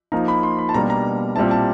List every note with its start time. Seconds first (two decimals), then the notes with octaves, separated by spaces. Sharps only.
0.12 F3 A#3 D#4 A#5
0.28 B5
0.43 C6
0.59 B5
0.69 A5
0.74 B2 G3 A#3 D4 A#5
0.90 A#5
1.36 A#2 G3 C4 E4 A5
1.51 A5